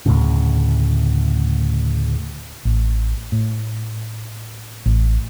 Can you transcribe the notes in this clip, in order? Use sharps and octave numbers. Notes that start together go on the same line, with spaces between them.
D2 A2 C#3
A1
A2
A1